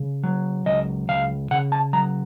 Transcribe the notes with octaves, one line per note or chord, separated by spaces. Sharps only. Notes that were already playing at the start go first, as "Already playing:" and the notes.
Already playing: C#3
F#3
C#2 D#5
C#2 F5
C#3 F#5
A5
F#3 A#5